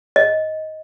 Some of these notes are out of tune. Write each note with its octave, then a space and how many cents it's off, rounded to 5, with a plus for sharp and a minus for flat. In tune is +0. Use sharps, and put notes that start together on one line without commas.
D#5 +10